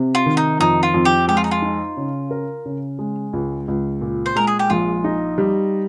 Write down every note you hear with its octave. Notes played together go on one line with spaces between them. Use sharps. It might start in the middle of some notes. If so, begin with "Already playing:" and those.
Already playing: C3
F4
D#3
D#4
F2 D#4
F4
F2
G4
G#3 G4
F4
D#4
F4
D#4
C#3
A#4
C#3
G#3
C#2
C#2
A#2
C5
G#3 A#4
G#4
G4
A#1 F4
D#4
G3